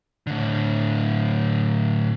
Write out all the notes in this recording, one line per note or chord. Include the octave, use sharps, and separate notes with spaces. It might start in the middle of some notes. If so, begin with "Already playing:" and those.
A2 D3